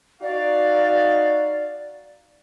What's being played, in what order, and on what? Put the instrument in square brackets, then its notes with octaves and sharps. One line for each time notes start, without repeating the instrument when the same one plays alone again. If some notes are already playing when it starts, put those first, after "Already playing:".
[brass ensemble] D#4 F#4 F5 [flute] D5